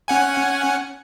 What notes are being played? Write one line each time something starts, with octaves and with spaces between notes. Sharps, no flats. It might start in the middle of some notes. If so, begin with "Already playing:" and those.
C#4 F#5 G#5